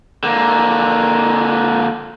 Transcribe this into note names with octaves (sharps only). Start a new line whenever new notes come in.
D3 A#3